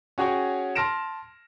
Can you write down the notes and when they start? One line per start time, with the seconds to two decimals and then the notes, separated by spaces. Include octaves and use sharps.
0.18 C#4 F#4 G#4 C#5 G5
0.75 A5 C6 F6 A#6 D7 E7